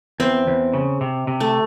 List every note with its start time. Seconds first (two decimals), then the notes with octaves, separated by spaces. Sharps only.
0.20 E2 C4
0.47 E2
0.74 C#3
1.01 C3
1.27 C3
1.40 A3